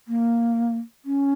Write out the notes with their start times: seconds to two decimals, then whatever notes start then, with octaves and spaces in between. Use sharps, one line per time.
0.08 A#3
1.05 C#4